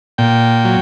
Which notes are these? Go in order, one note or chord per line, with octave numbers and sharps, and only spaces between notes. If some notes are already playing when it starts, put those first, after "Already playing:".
A#2 G5
F#3